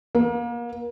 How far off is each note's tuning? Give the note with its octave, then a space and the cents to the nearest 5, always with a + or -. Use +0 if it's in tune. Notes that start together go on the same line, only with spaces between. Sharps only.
A#3 +35